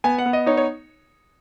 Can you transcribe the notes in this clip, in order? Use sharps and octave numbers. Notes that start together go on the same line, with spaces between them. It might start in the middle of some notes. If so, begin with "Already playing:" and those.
B3 G#5
F#5
B3
D#5
D#4 C#5
C#5